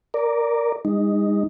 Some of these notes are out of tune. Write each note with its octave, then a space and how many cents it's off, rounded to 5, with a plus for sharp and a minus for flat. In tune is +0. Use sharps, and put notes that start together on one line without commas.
A#4 +0 D5 +0
G#3 -40 D#4 +0